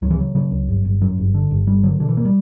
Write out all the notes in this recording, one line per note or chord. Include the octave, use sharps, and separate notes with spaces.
C#2 F#3
E3
C#3 F#3
C#3 F#3
C#2
G1
G1
F#2 F#3
G1
D3
G1
G1 G3
D3 F#3
B2 D3
E3
A#3
G3